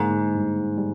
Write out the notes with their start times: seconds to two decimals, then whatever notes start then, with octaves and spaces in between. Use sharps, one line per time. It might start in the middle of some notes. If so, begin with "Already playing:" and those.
Already playing: G#2 D3 A#3
0.35 G2
0.78 G3